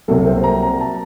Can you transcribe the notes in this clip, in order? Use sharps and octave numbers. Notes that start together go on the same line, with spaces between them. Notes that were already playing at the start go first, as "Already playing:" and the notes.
C2 C3 F#3 A#3 A4
C5
A#5
A#5
A5